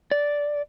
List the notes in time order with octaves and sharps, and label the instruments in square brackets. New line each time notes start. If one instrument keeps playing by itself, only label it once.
[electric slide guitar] D5